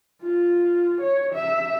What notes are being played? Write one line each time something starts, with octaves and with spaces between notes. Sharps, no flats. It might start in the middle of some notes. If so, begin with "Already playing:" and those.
F4
C#5
E5